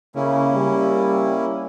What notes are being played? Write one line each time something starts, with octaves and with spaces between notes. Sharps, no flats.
C#3 A#3 C#4 E4
G3